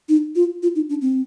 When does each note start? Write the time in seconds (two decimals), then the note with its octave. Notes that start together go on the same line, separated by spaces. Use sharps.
0.09 D#4
0.36 F4
0.63 F4
0.76 D#4
0.89 D4
1.02 C4